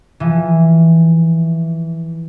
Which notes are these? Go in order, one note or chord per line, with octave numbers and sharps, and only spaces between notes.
E3 F3